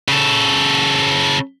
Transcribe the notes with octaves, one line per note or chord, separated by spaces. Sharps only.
C#3 A4